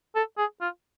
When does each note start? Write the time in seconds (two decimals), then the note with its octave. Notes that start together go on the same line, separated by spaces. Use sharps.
0.16 A4
0.38 G#4
0.61 F4